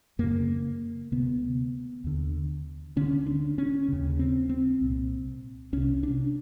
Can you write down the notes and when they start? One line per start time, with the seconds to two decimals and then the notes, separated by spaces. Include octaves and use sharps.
0.19 F#2 C#3 A#3
1.12 D2 C3 B3
2.04 D#2 D3
2.96 D2 D3 C#4
3.26 D4
3.58 C#4
3.88 D#2 C#3
4.19 C4
4.49 C4
4.81 C2 A#2
5.72 C2 C3 C#4
6.03 D4